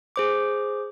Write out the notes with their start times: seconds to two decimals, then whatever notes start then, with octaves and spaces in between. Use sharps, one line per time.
0.16 G#4 C5 D6